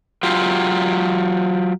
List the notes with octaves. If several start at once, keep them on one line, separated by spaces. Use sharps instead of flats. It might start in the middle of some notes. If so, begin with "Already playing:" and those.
F#3 F4 G4